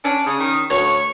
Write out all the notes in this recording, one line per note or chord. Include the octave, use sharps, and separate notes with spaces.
C#4 D4
C#3 D#6
D#3
D2 C#5 C#6